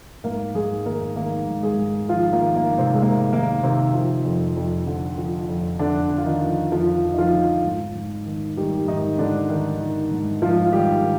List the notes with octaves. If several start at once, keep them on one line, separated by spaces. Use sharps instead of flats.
G#2 A#3 A#4
G#2 G#3 G#4
D#3 A#3 A#4
D#3 A#3 A#4
G#2
G#3 G#4
G#2
D#3 F3 F4
A#3
D#3
A#3
G#2
C3 C4
G#3
G#2 A#3
D#3 A#3
C3 D#3 C4
F3
F2
F2
D3
F3
F2
F2 D3 D4
D3
F4
D#3 D#4
F3
F2 F3 F4
F2
D#4
F3 F4
D3
G#2
G#2
D#3
D#3 G3 G4
G#2 D#3 D#4
G#2 D3 D4
D#3 D#4
D#3
G#2
G#2 F3 F4
F4
D#3 G3 G4
D#3